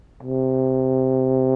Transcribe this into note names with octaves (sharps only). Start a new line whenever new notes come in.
C3